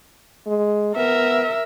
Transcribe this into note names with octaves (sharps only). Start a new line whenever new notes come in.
G#3
B3 A#4 E5